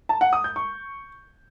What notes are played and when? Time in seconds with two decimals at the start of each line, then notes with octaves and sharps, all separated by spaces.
0.09 A5
0.21 F#5
0.33 D#6
0.44 G6
0.56 C#6